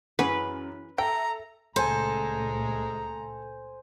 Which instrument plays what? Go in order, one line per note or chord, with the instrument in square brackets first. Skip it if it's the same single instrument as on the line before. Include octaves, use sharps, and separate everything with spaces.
[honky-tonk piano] F#2 [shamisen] E3 F#4 G#4 [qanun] B4
[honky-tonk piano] A4 E5 [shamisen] G5 [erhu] A#5
[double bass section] C#2 A#2 A3 [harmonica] G#3 A#5 [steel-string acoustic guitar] A4 [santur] C5 G#5